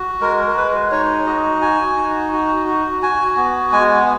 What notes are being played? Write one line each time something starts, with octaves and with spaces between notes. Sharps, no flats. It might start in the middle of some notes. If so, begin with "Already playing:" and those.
Already playing: F#4
G#3 A#4
A#4
G#3 B4
D#4 C#5
F#4 D#5
F#4 G#5
D#4
F#4
F#4
F#4 G#5
B3
G#3 G#5